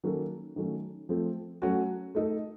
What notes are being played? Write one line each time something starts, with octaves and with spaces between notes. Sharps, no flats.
D#3 F#3 A#3 C#4 A4
D#3 F#3 A3 C#4
F3 A3 C4
F#3 A3 C#4 F#4
A3 D#4 A4